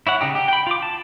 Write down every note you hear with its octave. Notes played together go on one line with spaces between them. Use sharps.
E4 C#5 F#5
C#3 D#4 G4
G4
G5 B5
F4 D6
A5